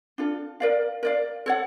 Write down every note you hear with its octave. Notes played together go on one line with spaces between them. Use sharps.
D4 F4 A4
A#4 D5 F5
A#4 D5 F5
A4 C#5 F#5